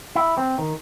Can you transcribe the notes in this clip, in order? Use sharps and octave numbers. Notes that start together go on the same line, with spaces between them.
E4
C4
D#3